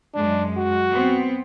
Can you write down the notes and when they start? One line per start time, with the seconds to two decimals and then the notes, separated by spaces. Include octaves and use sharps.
0.14 F#2 G#3 D4
0.57 F#4
0.91 B3 C4